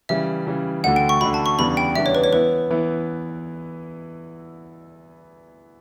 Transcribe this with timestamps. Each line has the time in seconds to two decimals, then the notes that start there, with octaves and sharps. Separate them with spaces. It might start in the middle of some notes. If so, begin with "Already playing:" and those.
0.09 C#3 E3 G3 E5
0.47 C#3 E3 G3
0.84 D2 D3 A3 D4 F#4 F#5
0.96 G5
1.09 C#6
1.21 D2 D3 A3 D4 F#4 B5
1.34 A5
1.46 C#6
1.59 E2 C#3 G3 B3 D4 B5
1.77 G5
1.96 E2 C#3 G3 B3 D4 E5
2.06 C#5
2.15 B4
2.24 C#5
2.33 E3 B3 E4 B4
2.70 E3 B3 E4